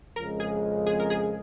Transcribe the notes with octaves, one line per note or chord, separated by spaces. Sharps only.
F2 C#3 G#3 A#4
G#4
G#4
A#4
G#4